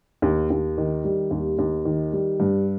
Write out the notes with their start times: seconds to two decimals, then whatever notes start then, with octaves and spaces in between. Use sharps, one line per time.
0.22 D#2
0.50 D#2
0.78 D#3
1.04 G3
1.31 D#2
1.58 D#2
1.85 D#3
2.13 G3
2.40 G2